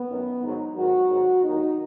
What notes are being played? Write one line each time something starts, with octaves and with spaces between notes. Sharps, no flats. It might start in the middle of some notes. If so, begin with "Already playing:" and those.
Already playing: B3
F#2 D#3 F#3
G#2 D#3 F#3 D#4
G#2 D#3 F#3 F#4
G#2 D#3 F#3
D#2 D#3 F#3 D#4